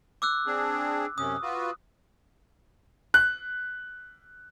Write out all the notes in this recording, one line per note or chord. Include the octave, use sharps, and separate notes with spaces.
D6 E6 F#6
C4 D4 G#4
F#2 C3 C#4 D#6
F4 F#4 B4
F#6